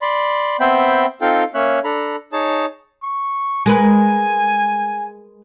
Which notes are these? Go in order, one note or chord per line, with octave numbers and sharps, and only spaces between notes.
D5 B5 C6
B3 C4 C5 E5 G5 B5
C4 D#4 F4 A4 F5 G5
A#3 C#4 C#5 E5 F#6
D4 A4 A#5 B5
D#4 G#4 C#5 A5
C#6
G#3 A#4 B4 G#5